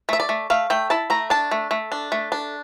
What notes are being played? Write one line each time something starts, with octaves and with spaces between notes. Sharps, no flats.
A3 E5
D5
A3
A3 F5
A3 G5
E4 A5
A3 A#5
D4 A5
A3
A3
D4
A3
D4